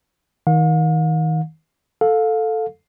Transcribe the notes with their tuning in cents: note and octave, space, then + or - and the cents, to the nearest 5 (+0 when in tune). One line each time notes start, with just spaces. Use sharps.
D#3 +25 F5 +45
A4 +0 F5 +25